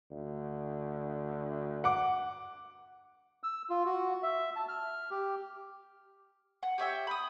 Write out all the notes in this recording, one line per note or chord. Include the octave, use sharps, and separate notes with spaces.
D2
F#5 D6
E6
F4
F#4
E5
A5
F6
G4
F#5
G4 C#5 E5 G5
B5 D#6